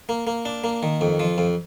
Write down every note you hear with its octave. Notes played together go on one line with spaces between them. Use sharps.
A#3
A#3
D4
A#3
D#3
F2
F3
F2